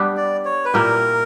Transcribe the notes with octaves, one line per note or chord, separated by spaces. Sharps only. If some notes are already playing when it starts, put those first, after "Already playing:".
Already playing: G3 B3 D4 G4
D5
C#5
B4
A#2 A#3 E4 G4 A#4